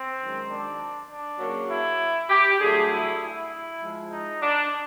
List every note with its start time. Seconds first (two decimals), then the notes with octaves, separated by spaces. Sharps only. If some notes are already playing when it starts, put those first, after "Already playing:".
Already playing: C4
0.19 F#2 D#3 G#3
0.49 D4
1.09 D4
1.39 C#3 F#3 A#3
1.70 E4
2.30 G4
2.60 G2 D3 F#3 A3 G#4
2.91 E4
3.21 E4
3.81 G#2 F3 G#3
4.11 D#4
4.42 D4